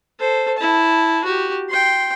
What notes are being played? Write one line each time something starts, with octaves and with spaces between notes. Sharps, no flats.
A4 C5
E4 A5
F#4 G4
G5 C6